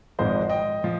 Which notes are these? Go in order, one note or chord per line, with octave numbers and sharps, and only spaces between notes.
G#1 G#2 F3 G#3 C5 D#5
D#5 G5
F3